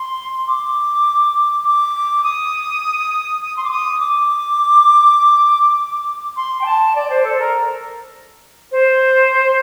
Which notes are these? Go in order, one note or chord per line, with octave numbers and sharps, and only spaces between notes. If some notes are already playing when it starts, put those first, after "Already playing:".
Already playing: C6
D6
D6
D#6
D#6
C6
D6
D#6
D6
C6
G5
A5
D5
C5
A4
A#4
C5